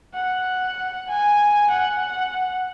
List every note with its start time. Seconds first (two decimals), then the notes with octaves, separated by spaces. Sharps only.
0.14 F#5
1.09 G#5
1.71 F#5